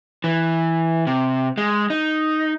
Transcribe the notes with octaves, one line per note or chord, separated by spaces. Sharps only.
E3
C3
G#3
D#4